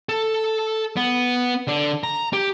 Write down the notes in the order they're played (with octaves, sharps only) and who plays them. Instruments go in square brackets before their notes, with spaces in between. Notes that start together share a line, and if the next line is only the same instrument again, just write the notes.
[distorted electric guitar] A4
B3
D3
A#5
G4